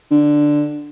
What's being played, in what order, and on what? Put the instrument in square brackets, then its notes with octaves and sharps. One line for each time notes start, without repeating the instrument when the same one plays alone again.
[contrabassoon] D3